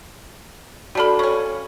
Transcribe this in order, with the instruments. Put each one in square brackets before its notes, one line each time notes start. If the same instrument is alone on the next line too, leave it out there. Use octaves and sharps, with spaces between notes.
[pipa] G3 D4 B5 [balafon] F#4 A4
[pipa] C#3 C#4 [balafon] C#6